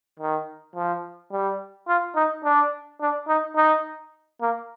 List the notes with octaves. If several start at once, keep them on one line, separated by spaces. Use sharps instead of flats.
D#3
F3
G3
F4
D#4
D4
D4
D#4
D#4
A#3